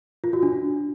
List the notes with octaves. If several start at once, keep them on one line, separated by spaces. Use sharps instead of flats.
F4
F#4
D4